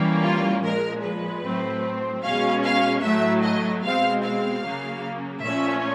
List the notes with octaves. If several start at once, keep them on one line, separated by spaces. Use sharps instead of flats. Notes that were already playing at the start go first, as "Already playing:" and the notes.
Already playing: E3 G3 A#3 C#4
F4
A#2 F3 G#3 A#4
B4
A2 F#3 A3 C4
B2 G#3 C#4 F5
F5
A2 F#3 A3 E5
D#5
B2 G#3 C4 F5
F5
C#3 F#3 A#3
A#2 F3 A3 C#4 E5